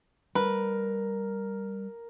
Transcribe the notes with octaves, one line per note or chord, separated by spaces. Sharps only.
G3 A#4 B4